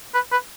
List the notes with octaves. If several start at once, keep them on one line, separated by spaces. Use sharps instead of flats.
B4
B4